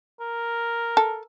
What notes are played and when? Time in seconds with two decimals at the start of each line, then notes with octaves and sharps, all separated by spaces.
0.20 A#4
0.97 A4